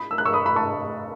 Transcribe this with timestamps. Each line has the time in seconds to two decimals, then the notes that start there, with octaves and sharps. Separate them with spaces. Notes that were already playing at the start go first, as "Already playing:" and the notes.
Already playing: B5 D#6
0.11 E6
0.18 F#6
0.25 C#6 E6
0.33 B5 D#6
0.46 B5
0.56 A5 C#6